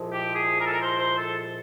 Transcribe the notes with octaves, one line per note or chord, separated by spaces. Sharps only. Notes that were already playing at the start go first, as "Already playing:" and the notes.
Already playing: C2 A#2 F3 G#3
G4
G#4
A#4
A4
A#4
C5
C5
A4